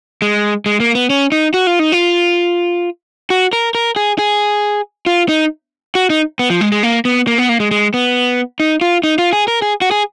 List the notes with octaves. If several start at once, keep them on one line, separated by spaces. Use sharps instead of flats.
G#3
G#3
A#3
B3
C#4
D#4
F#4
F4
D#4
F4
F#4
A#4
A#4
G#4
G#4
F4
D#4
F#4
D#4
B3
F3
G#3
G#3
A#3
B3
A#3
B3
A#3
G#3
G#3
B3
D#4
F4
D#4
F4
G#4
A#4
G#4
F#4
G#4